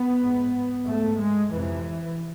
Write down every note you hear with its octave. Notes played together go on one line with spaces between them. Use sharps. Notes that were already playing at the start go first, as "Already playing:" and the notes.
Already playing: B3
G#2
G#2 A3
G#3
F2 C3 E3